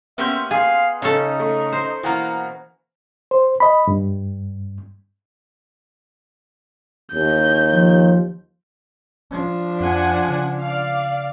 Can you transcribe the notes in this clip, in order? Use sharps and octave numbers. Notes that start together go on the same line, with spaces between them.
A#3 B3 C#4 G4 E5 C6 G6
G#4 F5
C#3 C#4 D#4 A4
A3
C5
B2 E3 A#3 F#5 A#5
C5
D#5 B5
G2
D#2 G6
F3
F3 D4
F2 F#5 G#5
C#3
D5 F5